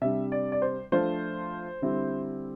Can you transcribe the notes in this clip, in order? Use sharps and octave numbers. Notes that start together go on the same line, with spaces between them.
C3 G3 D4 E5
D5
D5
C5
F3 A3 D4 F4 C5
D3 G3 C4 E4